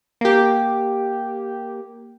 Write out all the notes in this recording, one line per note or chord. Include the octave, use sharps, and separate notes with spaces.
A#3 G4